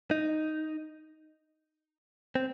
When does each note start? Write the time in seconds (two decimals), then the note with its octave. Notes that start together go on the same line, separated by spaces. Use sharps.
0.11 D#4
2.35 C4